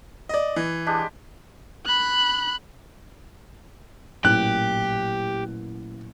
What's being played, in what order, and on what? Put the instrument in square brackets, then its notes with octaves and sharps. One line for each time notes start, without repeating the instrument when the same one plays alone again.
[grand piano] D5 D#5
E3
[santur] G#3 D4 G4
[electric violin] B5 F#6
[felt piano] A1 [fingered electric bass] A#2 F#3 A#3 [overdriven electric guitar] G4 [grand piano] F#6